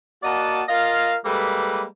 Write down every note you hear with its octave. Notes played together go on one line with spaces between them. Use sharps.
A#3 F#4 D5 D#5 F#5 A5
F4 A#4 D#5 F5
G3 G#3 A#3 A4 B4